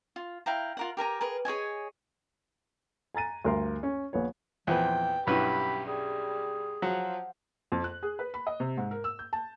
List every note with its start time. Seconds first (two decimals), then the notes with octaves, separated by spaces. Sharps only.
0.16 F4
0.46 E4 F5 G5 A#5
0.77 F4 A#4 F#5
0.97 G4 A#4 G#5 A#5
1.21 G#4 A#4 B4
1.45 G#4 C#5 D#5 G#5
3.15 G#5 A#5 A6 D#7
3.45 D2 G2 A#4 C6
3.83 C#4
4.13 A#1 B3 C#5
4.67 E2 A#2 F3 C4 B4 G5 G#5
5.27 B1 G2 C#4 E4 G4 B4 B5
5.88 G3 G#4
6.82 F3 F#3 F#5
7.72 F2
7.84 F#6
8.03 G#4
8.19 B4
8.34 B5
8.47 D#5
8.60 C3
8.77 G#2
8.91 A#4
9.04 E6
9.19 G6
9.33 A5